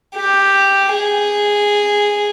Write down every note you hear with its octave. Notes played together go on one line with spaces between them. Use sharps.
G4
G#4